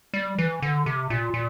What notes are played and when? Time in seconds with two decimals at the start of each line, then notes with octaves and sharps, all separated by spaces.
0.14 G3
0.38 E3
0.62 D3
0.86 C3
1.10 A#2
1.34 A#2